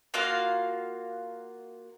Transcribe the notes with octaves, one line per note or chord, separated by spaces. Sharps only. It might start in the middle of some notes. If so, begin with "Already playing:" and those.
A#3 F4 F#4 F5